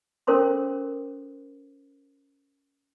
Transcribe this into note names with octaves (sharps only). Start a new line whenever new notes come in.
C#4 A4 A#4 C5 C6 D6